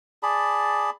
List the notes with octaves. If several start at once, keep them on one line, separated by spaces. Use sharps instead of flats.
G#4 D5 A5 B5